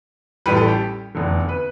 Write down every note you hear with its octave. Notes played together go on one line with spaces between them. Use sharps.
A1 A2 G3 B4
A4
G4
F1 E2 D3
B4